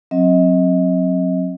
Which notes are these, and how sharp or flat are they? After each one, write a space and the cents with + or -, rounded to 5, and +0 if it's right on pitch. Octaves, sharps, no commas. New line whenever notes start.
F#3 -20 C4 +25 D#5 +30